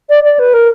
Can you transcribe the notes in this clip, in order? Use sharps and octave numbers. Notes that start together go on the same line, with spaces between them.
D5
D5
B4
A#4